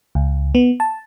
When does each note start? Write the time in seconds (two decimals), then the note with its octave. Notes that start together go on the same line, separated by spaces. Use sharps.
0.15 C#2
0.55 B3
0.80 A5